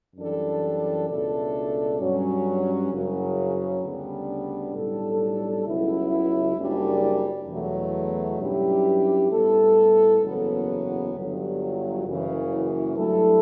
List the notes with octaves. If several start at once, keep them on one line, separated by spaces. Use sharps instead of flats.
F#2 E3 G3 D4 A4
C#2 B2 A3 D4 A4
G2 F#3 C#4
F#1 F#2 C#3 F#3
D2 C#3 G3 B3 D4
B1 A2 G3 D4 A4
C#2 C#3 F#3 B3 E4
F#1 F#2 C#3 G3 D4
E2 B2 F#3 A3
G2 F#3 C#4 E4 G4
A2 G3 B3 E4 A4
F#1 E2 C#3 F#3 B3
G1 G2 F#3
F#1 F#2 C#3 E3
G2 F#3 A3 E4 A4